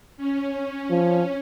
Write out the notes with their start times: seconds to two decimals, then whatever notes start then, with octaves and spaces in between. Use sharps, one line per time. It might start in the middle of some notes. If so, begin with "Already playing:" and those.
0.17 C#4
0.91 F3